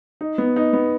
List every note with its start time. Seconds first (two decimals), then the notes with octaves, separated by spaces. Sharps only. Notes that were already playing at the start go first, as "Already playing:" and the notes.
0.21 D#4
0.38 B3
0.56 D#4
0.73 B3